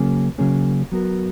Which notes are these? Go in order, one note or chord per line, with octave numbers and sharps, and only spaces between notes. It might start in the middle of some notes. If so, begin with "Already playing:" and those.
Already playing: C#3 F#3 A#3 C#4 G#4
C#3 F#3 A#3 C#4 G#4
F#3 B3 F#4 A#4